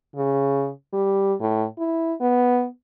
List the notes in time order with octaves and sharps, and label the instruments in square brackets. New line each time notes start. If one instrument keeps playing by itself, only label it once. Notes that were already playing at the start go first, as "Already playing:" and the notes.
[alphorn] C#3
G3
A2
E4
B3